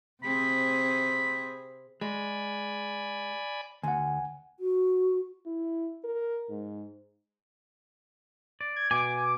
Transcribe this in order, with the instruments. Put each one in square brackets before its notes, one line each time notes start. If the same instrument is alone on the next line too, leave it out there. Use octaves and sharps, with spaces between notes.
[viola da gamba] C3 C4 G#4 [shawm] B5
[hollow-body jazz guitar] G#3 [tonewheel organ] D5 G#5 B5
[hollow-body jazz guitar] D2 [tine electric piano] F#5 G#5
[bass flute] F#4
[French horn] E4
A#4
G#2
[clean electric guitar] D5
[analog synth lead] G#6
[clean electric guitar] B2 [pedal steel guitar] G#5 [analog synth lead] D6